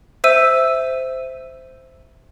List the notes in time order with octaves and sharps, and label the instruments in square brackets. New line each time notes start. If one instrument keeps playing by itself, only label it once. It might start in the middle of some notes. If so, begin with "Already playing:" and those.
[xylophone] C5 E5 E6 D#7